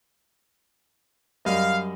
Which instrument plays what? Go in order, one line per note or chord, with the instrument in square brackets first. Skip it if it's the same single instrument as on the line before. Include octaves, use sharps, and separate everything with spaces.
[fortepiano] F#2 G3 D#5 [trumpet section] F5